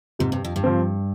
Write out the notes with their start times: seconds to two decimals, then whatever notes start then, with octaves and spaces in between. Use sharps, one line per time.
0.19 G#2 C3
0.32 G2
0.45 F2
0.56 G2
0.63 F3 C4